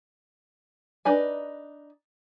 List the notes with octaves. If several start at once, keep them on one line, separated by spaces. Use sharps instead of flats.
D4 D#4 B4 G#5